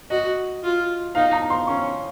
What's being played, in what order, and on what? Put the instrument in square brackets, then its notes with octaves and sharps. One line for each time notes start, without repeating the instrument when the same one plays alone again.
[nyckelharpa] F#4 [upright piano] D#5
[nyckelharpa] F4
[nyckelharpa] D#4 [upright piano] F5
[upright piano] A#5
C6
[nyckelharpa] C#4 [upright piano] C#6